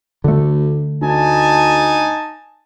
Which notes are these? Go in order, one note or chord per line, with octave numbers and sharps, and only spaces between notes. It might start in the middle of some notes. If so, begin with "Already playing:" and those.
D2 D3 A3
D2 D#4 G#5 A5